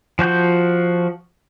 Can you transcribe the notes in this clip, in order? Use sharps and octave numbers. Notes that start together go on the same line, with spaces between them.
F3 F#4 G6